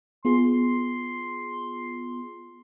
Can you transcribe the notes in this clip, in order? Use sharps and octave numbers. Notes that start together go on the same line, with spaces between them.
B3 F4 G#4 C6